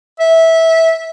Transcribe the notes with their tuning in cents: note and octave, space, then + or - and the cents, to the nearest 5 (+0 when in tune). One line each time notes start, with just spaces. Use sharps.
E5 -15